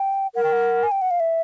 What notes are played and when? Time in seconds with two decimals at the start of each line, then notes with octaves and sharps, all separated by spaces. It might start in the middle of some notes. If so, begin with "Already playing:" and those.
Already playing: G5
0.35 A#4 F#5
0.44 G5
0.53 F#5
0.83 G#5
0.91 G5
1.02 F#5
1.11 F5
1.20 E5